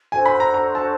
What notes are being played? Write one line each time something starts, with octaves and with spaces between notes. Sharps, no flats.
D4 F#4 A4 C5 G#5
B5
A#5
A#5
A5